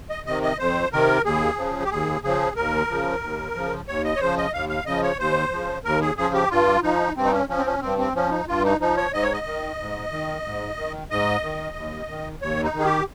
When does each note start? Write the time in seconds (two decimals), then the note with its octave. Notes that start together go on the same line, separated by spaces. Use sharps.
0.10 D#5
0.26 C3 D#3 D#5
0.43 D#5
0.59 F2 C5
0.92 C3 D#3 A#4
1.24 D#2 G#4
1.58 C#3 F3
1.84 G4
1.91 D#2 G#4
2.24 C#3 F3 G#4
2.56 D#2 A#4
2.90 C#3 F3
3.22 D#2
3.54 C#3 F3
3.87 D#2 C#5
4.04 D#5
4.16 C#5
4.20 C#3 F3 C5
4.37 D#5
4.54 D#2 F5
4.69 F5
4.86 C#3 F3 D#5
5.03 C#5
5.19 D#2 C5
5.52 C#3 F3
5.85 D#2 A#4
6.01 G#4
6.17 C#3 F3 G#4
6.34 G4
6.50 G2 F4
6.83 F3 D#4
7.16 G2 C4
7.25 D#4
7.32 C#4
7.49 F3 C#4
7.58 C4
7.66 C#4
7.81 G2 C4
7.98 C4
8.15 F3 C#4
8.31 D#4
8.48 G2 F4
8.64 D#4
8.81 F3 D#4
8.97 C#5
9.13 G#2 D#5
9.23 C#5
9.33 D#5
9.46 D#3
9.79 G#2
10.11 D#3
10.45 G#2
10.77 D#3
11.10 G#2 D#5
11.43 D#3
11.76 D#2
12.09 D#3
12.41 D#2 C#5
12.64 D#4
12.74 D#3
12.79 G#4
12.85 G4